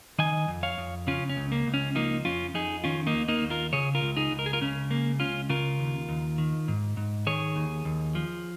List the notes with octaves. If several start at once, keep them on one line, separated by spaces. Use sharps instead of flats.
D#3 D#5 G#5
F2
C#5 F5
F2
C#3 C#4 F4
C#4
C#2
A#3
C#2
C#4
F3 A#3 D#4
F2 C#4 F4
F2 D#4 G#4
D#3 C#4 F4
A#3 D#4
D#2
A#3 D#4
D#2
F4 A#4
C#3 G#4 C#5
F4 A#4
C#2
D#4 G#4
C#2
A#4
G#4
F4 A#4
C#3 C#4
G#3 A#3
C#2 C#4 F4
C#3 F4 A#4
D#2
D#2
D#3
G#2
G#2
D#3 G#4 C#5
D#2
D#2
F3